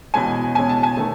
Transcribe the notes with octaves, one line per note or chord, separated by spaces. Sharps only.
E2 B2 G#3 C#4 G#5
E2 B2 G#3 C#4 G#5
A5
G#5
D#3 A3